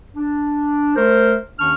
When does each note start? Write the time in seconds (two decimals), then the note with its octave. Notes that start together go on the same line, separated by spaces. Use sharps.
0.15 D4
0.96 A3 A#4 C5
1.59 D#2 D#3 C#4 D4 C#6 F6